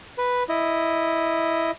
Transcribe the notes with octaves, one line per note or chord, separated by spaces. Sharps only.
B4
E4 D#5